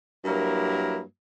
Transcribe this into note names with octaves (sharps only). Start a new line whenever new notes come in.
G2 F#3 A#3 E4 A#4